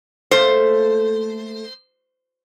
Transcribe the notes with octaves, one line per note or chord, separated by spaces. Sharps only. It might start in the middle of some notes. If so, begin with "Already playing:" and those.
A3 A#3 F4 C5